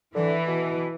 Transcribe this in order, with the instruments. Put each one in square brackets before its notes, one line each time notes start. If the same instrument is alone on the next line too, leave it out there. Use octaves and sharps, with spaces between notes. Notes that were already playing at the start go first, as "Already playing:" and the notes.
[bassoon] D3 [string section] E3
[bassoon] B2